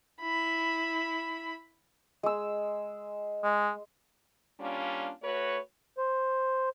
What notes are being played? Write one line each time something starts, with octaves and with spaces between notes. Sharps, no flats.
E4 B5
G#3 E6
G#3
G3 A#3 C#4 D4 F4
A3 F#4 B4 C#5
C5